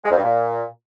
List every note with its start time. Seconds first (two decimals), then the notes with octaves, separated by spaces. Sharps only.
0.05 G#3
0.11 F2
0.17 G2
0.23 A#2